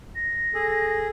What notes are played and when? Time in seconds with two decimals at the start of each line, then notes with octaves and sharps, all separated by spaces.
0.15 A#6
0.54 G#4 A4